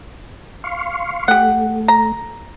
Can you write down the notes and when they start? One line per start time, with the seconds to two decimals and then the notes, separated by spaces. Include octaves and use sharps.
0.64 F5 C6 C#6
1.28 A3 G4 F#5
1.88 A#5